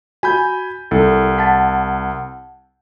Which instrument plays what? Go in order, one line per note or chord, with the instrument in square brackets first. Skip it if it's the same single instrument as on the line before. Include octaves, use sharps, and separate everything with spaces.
[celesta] F#4 [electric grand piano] G#5 B5 G6
[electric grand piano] C2 [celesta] E4 A4
[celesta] F#5 A5 A6